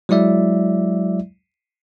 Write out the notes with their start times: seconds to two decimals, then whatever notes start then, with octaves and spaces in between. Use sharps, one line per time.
0.09 F#3 G#3 E4 D5 E5